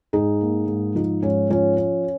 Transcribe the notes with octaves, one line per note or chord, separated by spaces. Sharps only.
G#2 D#4 G#4
A#3
G#2
F3 D#4
G#2 C#4
F3 C#4
C#4